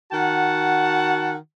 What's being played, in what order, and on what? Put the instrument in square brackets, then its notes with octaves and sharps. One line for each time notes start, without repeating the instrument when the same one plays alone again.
[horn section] D#3 F#4 F#5 A5